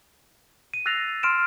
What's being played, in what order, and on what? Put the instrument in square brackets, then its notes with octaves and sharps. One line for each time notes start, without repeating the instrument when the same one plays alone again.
[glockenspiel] D#7
E6 F#6 A6 A#6 C7 F7
C6 F6 D7 E7